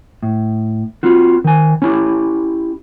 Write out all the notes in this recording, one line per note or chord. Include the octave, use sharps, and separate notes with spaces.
A2
C4 F4 F#4
D#3 G#5
C#4 E4 G4